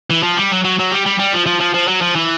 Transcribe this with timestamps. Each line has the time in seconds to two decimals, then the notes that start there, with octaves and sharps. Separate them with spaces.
0.10 E3
0.23 F3
0.37 G3
0.52 F#3
0.64 F#3
0.79 F#3
0.92 G3
1.06 G3
1.19 G3
1.33 F3
1.46 F3
1.60 F3
1.74 F3
1.88 F#3
2.02 F3
2.15 E3